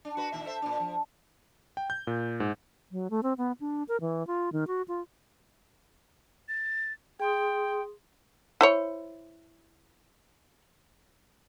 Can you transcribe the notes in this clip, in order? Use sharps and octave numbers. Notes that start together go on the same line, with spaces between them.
D4
F#4 B4
A#2 D#3 E5
A4 C5 E5
A#2 D4
F3
G5
G6
A#2
G#2
F#3
A3
C4
B3
D4
A#4
E3
F4
D#3
F#4
F4
A6
G#4 G5 C6 D#6
E4 C5 C#5